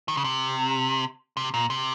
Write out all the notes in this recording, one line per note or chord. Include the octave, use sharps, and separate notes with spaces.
D#3
C#3
C3
C3
A#2
C3